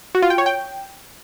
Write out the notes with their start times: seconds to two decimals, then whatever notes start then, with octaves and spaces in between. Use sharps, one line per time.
0.15 F#4
0.22 F4
0.30 G5
0.38 C#5
0.46 G5